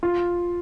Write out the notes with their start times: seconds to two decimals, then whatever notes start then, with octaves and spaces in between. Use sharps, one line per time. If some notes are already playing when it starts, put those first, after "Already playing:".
0.03 F4